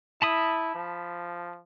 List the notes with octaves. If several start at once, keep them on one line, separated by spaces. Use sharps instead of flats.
E4 A5 B5 D#6
F3